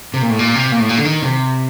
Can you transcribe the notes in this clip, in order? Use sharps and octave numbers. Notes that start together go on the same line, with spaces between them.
C3
A#2
A2
A#2
C3
A#2
A2
A#2
D3
D#3
C3